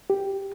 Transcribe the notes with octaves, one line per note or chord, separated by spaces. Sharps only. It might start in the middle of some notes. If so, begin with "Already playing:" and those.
G4